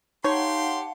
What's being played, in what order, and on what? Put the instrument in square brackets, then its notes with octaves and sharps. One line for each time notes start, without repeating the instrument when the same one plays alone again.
[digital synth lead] D#4 [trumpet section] G4 C6 [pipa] C#5 [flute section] F5 F#5 A5